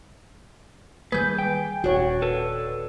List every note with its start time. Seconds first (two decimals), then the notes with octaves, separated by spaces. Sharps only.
1.12 D#3 G3 A#3 G#4 B4 G6
1.39 G5
1.84 D#1 D4 F#4 C#5
2.22 A4 B4